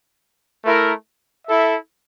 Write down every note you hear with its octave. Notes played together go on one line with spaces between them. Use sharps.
A3 E4 A#4
E4 A4 E5